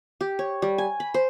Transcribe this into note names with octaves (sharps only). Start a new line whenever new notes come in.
G4
C#5
G3
G#5
B5
C5